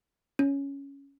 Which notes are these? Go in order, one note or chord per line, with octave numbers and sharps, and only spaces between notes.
C#4